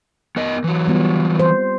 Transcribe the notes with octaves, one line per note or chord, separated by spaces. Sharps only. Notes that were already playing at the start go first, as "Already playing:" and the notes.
B3 A#4 D#5
E3 F#3
G3 B3 F4
C5